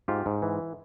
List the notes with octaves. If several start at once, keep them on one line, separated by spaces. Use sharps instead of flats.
G#2 F4 G4
G#2
E3